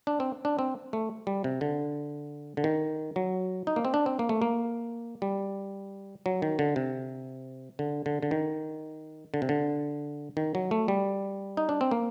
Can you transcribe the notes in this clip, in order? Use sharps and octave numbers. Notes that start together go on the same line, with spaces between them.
D4
C4
D4
C4
A3
G3
C3
D3
D3
D#3
F#3
D#4
A#3
C4
D4
C4
A#3
A3
A#3
G3
F#3
D#3
D3
C3
D3
D3
D3
D#3
D3
C3
D3
D#3
F#3
A3
G3
D#4
D4
C4
A#3